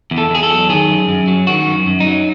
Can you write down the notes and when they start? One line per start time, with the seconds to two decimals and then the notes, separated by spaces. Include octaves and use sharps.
0.11 E2
0.18 A4
0.30 E2 G#4
0.43 A4
0.50 F#3
0.69 D#3 G#4
0.88 F#2
1.09 F#2
1.28 F#3
1.47 D#3 F#4
1.67 F#2
1.87 F#2
2.00 D#4
2.07 F#3